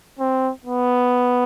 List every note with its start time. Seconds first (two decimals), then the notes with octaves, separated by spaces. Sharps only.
0.19 C4
0.66 B3